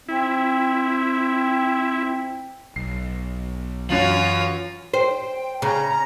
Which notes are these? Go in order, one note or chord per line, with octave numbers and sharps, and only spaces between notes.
C4 E4
B1 C7
F#2 E3 F4 C#5 F#7
C5 G5
C#3 A#5